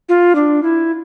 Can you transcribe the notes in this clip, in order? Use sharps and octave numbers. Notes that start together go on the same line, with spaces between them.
F4
D4
E4